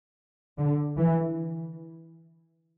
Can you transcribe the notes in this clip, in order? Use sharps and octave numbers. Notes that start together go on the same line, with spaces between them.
D3
E3